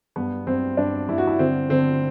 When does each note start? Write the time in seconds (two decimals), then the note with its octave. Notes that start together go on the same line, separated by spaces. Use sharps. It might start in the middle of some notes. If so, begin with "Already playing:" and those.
0.16 G2 B3
0.47 G2 C4
0.77 G2 D4
1.08 G2 E4
1.18 F#4
1.27 E4
1.39 D3 C4
1.70 D3 C4